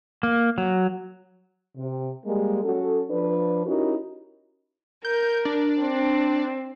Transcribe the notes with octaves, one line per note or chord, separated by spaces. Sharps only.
A#3
F#3
C3
G3 G#3 A#3
F#3 C#4 F#4 A4
F3 D4 B4
C#4 D#4 E4 F#4 G4 A#4
A#4 G6
D4
C4